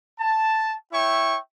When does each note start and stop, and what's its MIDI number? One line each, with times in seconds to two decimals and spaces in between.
0.19 0.73 81
0.92 1.37 64
0.92 1.37 73
0.92 1.37 76
0.92 1.37 79
0.92 1.37 85